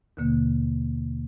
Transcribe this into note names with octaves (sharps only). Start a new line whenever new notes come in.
D#2 B2 D3 A#3